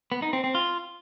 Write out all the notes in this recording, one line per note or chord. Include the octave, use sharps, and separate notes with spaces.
B3
D#4
C4
C4
F4